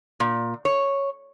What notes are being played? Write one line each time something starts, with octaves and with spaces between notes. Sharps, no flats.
A#2
C#5